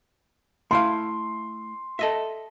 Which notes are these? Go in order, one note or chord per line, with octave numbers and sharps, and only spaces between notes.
A3 E4 F5 C6
A4 D#5 E5